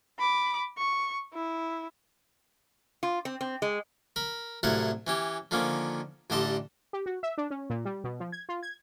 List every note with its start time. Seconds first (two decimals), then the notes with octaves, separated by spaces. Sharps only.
0.19 B5 D6
0.78 C#6
1.34 E4
3.03 F4
3.25 C4
3.41 C4
3.62 G#3
4.16 A#4 B5
4.63 C2 A2 F#3 A3 F5 F#5
5.07 E3 C#4 G4
5.51 D3 D#3 F3 A#3 C#4
6.30 A1 D3 G3 D#5 A5 C6
6.93 G4
7.06 F#4
7.23 E5
7.38 D4
7.50 C#4
7.70 A#2
7.85 G3
8.04 B2
8.20 F3
8.32 G#6
8.49 F4
8.63 G#6